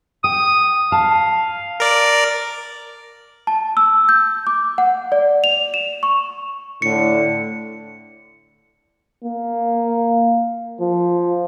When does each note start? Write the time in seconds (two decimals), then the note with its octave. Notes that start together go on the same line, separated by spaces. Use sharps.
0.24 G5 D#6
0.92 F5 A5
1.80 A#4 D5
3.47 A5
3.77 E6
4.09 G6
4.47 D6
4.78 F#5
5.12 D5
5.44 F7
5.74 E7
6.03 C#6
6.82 A2 D3 C#7
9.24 A#3
10.81 F3